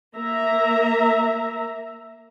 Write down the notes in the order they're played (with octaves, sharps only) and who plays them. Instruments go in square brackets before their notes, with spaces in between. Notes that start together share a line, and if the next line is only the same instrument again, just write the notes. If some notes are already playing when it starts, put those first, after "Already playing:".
[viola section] A#3 E5 A#5